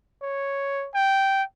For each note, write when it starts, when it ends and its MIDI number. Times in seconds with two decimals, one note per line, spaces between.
0.22 0.88 73
0.94 1.43 79